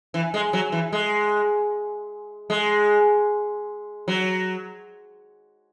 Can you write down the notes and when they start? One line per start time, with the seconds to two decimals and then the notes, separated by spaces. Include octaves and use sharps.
0.14 E3
0.34 G#3
0.53 F#3
0.72 E3
0.93 G#3
2.50 G#3
4.08 F#3